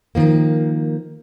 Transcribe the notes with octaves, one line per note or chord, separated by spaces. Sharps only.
D#3 F3 A#3